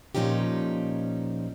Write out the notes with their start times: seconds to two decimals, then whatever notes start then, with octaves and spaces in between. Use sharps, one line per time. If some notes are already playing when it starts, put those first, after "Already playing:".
0.15 A#2 F3 C#4 D#4 G4